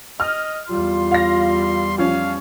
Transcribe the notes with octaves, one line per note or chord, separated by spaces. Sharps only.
D#5 F6
E2 G3 F4 C6
F5 A#6
F3 C#4 F5